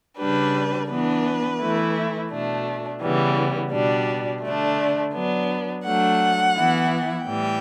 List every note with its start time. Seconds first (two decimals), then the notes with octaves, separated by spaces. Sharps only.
0.18 C#3 G3 D4 B4
0.89 E3 B3 D4 B4
1.60 E3 A3 E4
2.30 B2 A3 D4
3.01 C#3 E3 G3 B3
3.71 B2 G3 D4
4.43 D3 A3 D4
5.13 F#3 B3 D4
5.84 F#3 A3 D4 F#5
6.55 E3 B3 E4
7.25 A2 E3 G3 G5